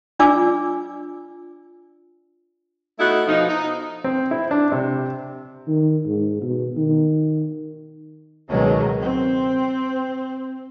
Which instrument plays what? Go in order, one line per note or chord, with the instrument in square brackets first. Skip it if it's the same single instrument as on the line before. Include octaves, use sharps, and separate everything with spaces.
[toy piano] D4 F4 D5 G#5 D6 E6
[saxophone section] A3 B3 D#4 E4 F#4 A4
B2 F3 D#4
D#4
[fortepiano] C4
E4
D4
C3
[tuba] D#3
G#2
B2
D#3
[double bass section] C#2 B2 D#3 F#3 G#3
C4